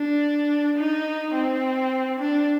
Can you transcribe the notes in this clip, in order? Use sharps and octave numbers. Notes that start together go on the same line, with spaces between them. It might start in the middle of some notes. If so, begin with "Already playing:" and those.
Already playing: D4
D#4
C4
D4